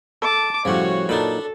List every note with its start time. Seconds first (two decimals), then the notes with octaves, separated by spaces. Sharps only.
0.22 A4 A5 D6
0.65 A2 C#3 F3 G3 F#4 C#5 F#5
1.09 A#2 F#3 D4 D#4 A4 A5 B5